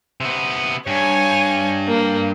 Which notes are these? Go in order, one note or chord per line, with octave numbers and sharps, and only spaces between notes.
C3 B3
G2 C#5 G#5
A#3